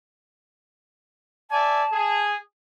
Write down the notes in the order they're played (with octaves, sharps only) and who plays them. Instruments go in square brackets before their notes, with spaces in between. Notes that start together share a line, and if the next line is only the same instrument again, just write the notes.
[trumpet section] D5 E5 G#5 [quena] A5
[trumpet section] G#4